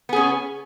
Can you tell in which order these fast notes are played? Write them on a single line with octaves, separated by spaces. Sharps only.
B3 G#4 C#4